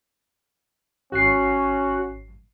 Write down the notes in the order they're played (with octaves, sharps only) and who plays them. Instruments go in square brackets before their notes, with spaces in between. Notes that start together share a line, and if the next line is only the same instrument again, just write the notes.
[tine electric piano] G#1 C7 [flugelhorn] C#4 [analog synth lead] F#4